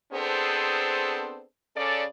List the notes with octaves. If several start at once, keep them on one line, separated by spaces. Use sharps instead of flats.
B3 C4 D4 G#4 A4 C5
C#3 C#4 A4 D5